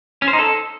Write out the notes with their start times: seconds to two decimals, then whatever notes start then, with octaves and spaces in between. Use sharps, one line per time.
0.22 C#4
0.28 C5
0.33 D#4
0.39 A4